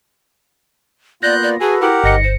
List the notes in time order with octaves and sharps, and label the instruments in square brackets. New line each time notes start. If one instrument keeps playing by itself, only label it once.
[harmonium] A#3 B3 F4 [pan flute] D5 [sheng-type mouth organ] F#6 G6 [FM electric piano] A#6
[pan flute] D5
[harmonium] F#4 A4 B4 [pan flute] G#4 [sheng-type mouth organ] G#5
[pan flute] E4 [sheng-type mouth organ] G4 A#4 F#5
[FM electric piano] G1 A#6 C#7 [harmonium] G#2 [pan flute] D#5
[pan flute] C5